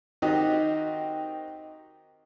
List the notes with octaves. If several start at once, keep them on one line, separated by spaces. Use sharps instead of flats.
D#3 C4 D#4 F#4 G4